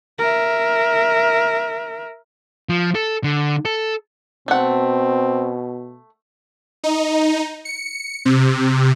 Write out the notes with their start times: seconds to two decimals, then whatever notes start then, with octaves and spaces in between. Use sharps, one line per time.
0.19 A#4 E5
2.69 F3
2.95 A4
3.24 D3
3.65 A4
4.48 B2 A3 C4 F#5
6.84 D#4
7.65 C#7
8.25 C3